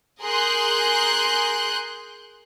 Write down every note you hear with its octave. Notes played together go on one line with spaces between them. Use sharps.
G#4 A#4 C6 F#6 G6